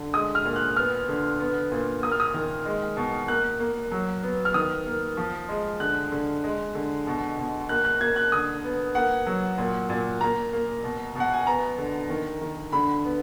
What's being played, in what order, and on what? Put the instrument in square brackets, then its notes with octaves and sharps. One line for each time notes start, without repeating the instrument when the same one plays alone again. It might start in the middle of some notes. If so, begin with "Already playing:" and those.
Already playing: [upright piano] D3
G#3 D#6
F6
A#2
F#6
B3 F6
D3
B3
A#2
A#3 D#6
F6
D#6
D#3
G#3
B2
A#3 F#6
A#3
F#3
B3
F6
D#3 D#6
A#3
F3
G#3
D3 F#6
D3
G#3
D3
B2
B2
A#3 F#6
F#6
A#3 G#6
F#6
D3 D#6
B3
A#3 F#5
F#3
A#2
A#2
A#3 A#5
A#3
B2
B2 F#5
G#5
B3 A#5
D3
D#3
D#3
D3 B5
B3